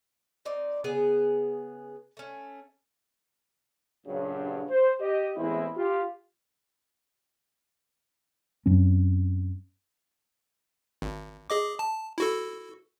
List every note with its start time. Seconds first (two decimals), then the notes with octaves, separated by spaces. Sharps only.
0.45 C4 D#4 D5
0.84 C#3 B3 G#4
2.17 A3 C#4
4.07 A#1 G2 C#3 F#3
4.69 C5
5.00 G4 D#5
5.37 A1 E2 G#3 C4 E4
5.76 F4 G4
8.66 F#2 F#3 C4 C#4
11.02 G#1
11.50 G#4 D#5 D6
11.79 A5
12.18 E4 F#4 A4